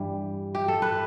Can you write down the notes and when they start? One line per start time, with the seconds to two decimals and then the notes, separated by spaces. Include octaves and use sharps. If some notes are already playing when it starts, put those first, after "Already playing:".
Already playing: G2 E3 G3
0.55 G4
0.68 A4
0.82 B4